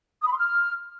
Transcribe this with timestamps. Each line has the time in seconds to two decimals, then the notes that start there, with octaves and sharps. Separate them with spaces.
0.22 D#6
0.27 B5
0.32 C6
0.37 F6